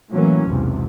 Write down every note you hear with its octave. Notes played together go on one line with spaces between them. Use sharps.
A2 E3 F#3 A#3 C#4
B1 E2 G#2 C3